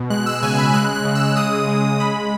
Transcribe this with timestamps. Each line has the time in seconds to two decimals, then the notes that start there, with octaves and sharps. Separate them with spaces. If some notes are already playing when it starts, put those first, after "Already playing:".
Already playing: B2
0.10 G#3 F#6
0.26 E6
0.43 C#3 G#5
0.58 B5
0.74 G#3 F#6
0.94 F#6
1.05 C#3
1.15 E6
1.36 G#3 D#6
1.68 G#3
2.00 G#3 B5